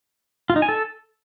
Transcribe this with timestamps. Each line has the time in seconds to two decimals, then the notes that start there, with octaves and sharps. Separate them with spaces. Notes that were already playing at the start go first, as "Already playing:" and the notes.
0.50 F4
0.56 D#4
0.62 G#5
0.69 A4